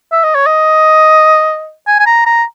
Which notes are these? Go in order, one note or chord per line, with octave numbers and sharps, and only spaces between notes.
E5
D#5
C#5
D#5
G#5
G#5
A#5
A#5